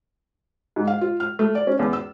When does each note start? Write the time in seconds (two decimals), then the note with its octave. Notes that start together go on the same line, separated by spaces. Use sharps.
0.76 G#2
0.87 F5
1.01 F4
1.20 F6
1.39 A3
1.55 D5
1.67 C#4
1.79 E2
1.93 E6